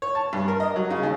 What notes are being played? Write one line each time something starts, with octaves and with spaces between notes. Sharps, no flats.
C#5
A5
G2
A#4
D#5
F#3
C#3
D#2